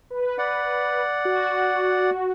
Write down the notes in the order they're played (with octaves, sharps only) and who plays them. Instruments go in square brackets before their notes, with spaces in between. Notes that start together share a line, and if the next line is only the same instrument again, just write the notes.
[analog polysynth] B4
[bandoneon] D5 F#5
[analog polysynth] F#4